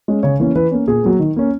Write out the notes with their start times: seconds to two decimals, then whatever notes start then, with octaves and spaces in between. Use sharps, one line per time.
0.08 G#3 C#4
0.23 C#3 C#5
0.40 E3 A#3 C#4
0.55 E3 B4
0.71 A#3 C#4
0.88 A#2 G#4
1.03 F#3 A#3
1.19 D#3
1.36 A#3 C#4